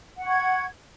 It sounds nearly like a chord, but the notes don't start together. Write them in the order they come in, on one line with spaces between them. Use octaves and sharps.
F#5 C#6 G#6